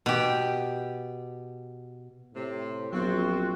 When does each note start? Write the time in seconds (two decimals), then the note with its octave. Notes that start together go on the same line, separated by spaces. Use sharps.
0.06 B2 G4
2.34 A2 C3
2.93 A#1 F#3 B3 C4 F4 F#4